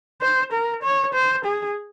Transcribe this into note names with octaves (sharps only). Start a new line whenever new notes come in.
C5
A#4
C#5
C5
G#4